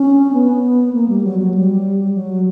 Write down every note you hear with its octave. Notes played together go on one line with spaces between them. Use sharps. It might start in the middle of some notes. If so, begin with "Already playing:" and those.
Already playing: C#4
B3
A#3
G3
F#3
F#3
G3
F#3